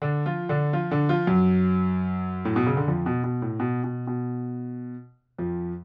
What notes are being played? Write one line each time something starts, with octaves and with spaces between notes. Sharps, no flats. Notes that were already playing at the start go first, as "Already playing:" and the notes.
D3 D4
F3 F4
D3 D4
F3 F4
D3 D4
F3 F4
F#2 F#3
A2
B2
C#3
D3
F2 F3
B2
B2
A2
B2
B2
B2
F2 F3